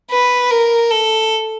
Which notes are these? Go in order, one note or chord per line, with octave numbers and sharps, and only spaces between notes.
B4
A#4
A4